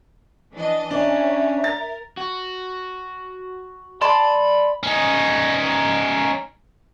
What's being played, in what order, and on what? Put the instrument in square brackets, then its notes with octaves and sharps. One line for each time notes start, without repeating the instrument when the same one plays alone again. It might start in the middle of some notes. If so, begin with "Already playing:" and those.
[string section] E3 D4 D#5
[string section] C#4 [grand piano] D4 [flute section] E5 A#5
[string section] A#4 [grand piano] A6
[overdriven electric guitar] F#4
[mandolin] D5 A5 C6 [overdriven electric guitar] B5
[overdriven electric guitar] C#4 D#4